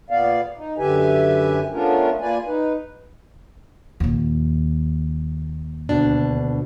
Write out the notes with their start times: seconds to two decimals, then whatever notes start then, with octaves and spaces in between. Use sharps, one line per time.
0.10 A#2 B3 D5 F5
0.57 D#4
0.78 F#2 D3 G4 B4 E5 G#5
1.72 A3 B3 C#4 D4 F4 A#4
2.21 A#3 F4 B4 D5 G#5
2.46 D#4 B4
4.00 D#2 A#2
5.89 D2 B2 D4